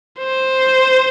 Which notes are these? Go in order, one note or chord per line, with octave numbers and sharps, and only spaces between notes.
C5